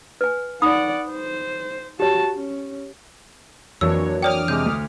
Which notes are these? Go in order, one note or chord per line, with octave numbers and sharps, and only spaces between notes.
B4 G#5
D#4 D5 F#5 B5 D#6
C5
F#4 G4 C#5 A5
C#4
F2 E3 F#3 A#3 D4 C#5 E6
C#5 D5 G5 D6 D#6 F6
C3 G#3 G6
D2